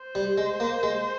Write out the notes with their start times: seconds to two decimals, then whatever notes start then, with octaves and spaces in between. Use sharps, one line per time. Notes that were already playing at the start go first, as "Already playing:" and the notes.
Already playing: C5
0.15 G3
0.38 G#3
0.60 A#3
0.83 G#3